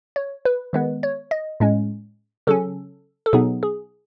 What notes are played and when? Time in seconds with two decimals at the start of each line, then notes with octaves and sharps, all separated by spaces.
0.16 C#5
0.45 B4
0.73 D#3 G#3 B3 B4
1.03 C#5
1.31 D#5
1.60 A2 G#3 C#4
2.47 C#3 F#3 C#4 A4
3.26 A4
3.33 B2 F#3 B3 D#4 G#4
3.63 G#4